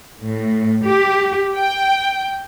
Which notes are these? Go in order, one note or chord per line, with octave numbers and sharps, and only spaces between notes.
A2
G4
G5